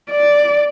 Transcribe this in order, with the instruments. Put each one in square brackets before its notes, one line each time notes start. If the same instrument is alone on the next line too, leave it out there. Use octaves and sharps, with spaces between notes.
[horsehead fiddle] D5